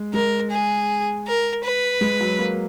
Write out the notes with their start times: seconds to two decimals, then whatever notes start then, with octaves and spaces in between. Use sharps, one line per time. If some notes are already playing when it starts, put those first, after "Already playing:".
Already playing: G#3
0.13 G#3 A#4
0.51 G#4
1.27 A#4
1.64 B4
2.01 G#3
2.20 F#3
2.39 A#3